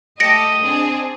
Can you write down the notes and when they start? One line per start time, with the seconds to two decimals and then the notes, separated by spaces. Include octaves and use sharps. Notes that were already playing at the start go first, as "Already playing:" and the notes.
0.20 A3 G4 A4 D#5 A#6 C#7 D7
0.61 C4 D4 G#4